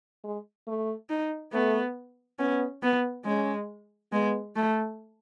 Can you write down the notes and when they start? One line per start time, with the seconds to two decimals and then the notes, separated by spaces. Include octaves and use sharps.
0.24 G#3
0.67 A3
1.10 D#4
1.53 A3 B3
2.39 B3 C#4
2.83 B3
3.25 G#3 C#4
4.12 G#3 B3
4.56 A3